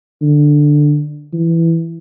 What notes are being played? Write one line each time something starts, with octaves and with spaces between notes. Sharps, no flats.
D3
E3